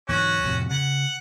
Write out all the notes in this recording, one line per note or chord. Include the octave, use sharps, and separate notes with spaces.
E2 G#2 C#4 F#4
F2 A2 C3
C#3 F#5